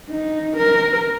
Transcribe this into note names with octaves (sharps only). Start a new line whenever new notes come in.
D#4
A#4